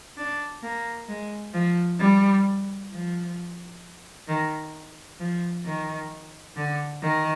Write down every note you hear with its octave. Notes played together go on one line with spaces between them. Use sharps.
D4
A#3
G#3
F3
G3
F3
D#3
F3
D#3
D3
D#3